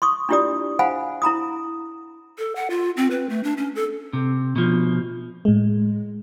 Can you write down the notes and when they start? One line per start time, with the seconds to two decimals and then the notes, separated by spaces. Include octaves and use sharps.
0.02 C6 C#6 D#6
0.29 D4 E4 F4 G4 D5 D#6
0.79 C5 F5 F#5 G#5 B5
1.22 E4 A#5 B5 D#6
2.38 A4
2.56 F#5
2.70 F4
2.97 C4
3.11 B4
3.29 A3
3.44 D4
3.57 C#4
3.75 A4
4.13 C3
4.56 B2 F3
5.45 A2 G#3